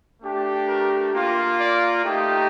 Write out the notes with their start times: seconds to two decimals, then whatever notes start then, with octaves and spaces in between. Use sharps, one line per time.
0.22 A3 D4 G4
0.67 A#4
1.13 A#3 F4
1.58 D5
2.03 A3 D#4 G4